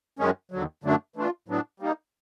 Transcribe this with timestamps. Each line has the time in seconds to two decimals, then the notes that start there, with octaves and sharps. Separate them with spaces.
0.19 F#2 D#3 G#3 C#4
0.52 D#2 D3 F#3
0.84 F#2 D3 F#3 A3 D4
1.16 E3 A3 D4 F4
1.48 A2 F#3 B3 D4
1.80 G3 A#3 D#4